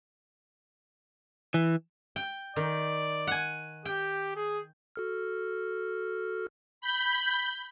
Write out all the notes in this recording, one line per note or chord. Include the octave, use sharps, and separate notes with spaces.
E3
G5
D#3 D5
F#5 G#5
G4 G5
G#4
F#4 A4 F6
B5 G6